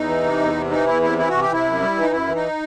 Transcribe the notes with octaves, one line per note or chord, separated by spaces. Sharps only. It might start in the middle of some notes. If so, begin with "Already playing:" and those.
Already playing: E2 D#4
E3
C3
E2
C3
E3 D#4
E2 E4
C3 E4
E3 E4
C3 F#4
G4
C3 E4
F#2
G3
E3
D#4
F#2 E4
E3
D#4